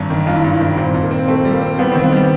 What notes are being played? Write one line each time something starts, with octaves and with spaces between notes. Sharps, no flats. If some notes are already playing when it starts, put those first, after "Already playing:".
Already playing: G#1 G2
D#3
G2 F4
E4
G2 F4
E4
D#3
A#2 C4
A#2
A#3
C4
A3 C4
G3
A#3
C4
G3 B3
D#3 C4
B3
G3